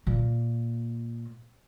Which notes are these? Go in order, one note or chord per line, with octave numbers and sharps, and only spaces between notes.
A#2 A#3